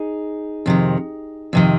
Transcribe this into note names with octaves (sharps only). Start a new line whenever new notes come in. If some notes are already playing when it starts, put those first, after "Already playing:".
Already playing: D#4 G#4
F2 C3 D#3
F2 C3 D#3